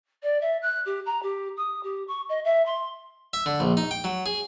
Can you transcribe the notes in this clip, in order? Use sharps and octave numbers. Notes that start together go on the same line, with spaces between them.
D5
E5
F#6
G4
A#5
G4
D#6
G4
C#6
D#5
E5
C6
E5
D3
A#1
D#4
G5
F#3
G#4